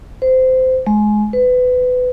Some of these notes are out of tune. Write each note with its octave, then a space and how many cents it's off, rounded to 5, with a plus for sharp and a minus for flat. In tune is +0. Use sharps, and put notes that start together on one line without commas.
C5 -20
G#3 +20
B4 +25